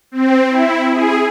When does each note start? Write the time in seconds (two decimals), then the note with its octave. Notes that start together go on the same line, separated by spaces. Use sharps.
0.12 C4
0.49 E4
0.91 G#4